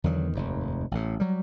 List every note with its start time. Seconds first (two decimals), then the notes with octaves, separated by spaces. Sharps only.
0.04 E2 D3 D#3 F#3
0.33 F1 D#2 G#2
0.91 A1 A2
1.20 F#3 G3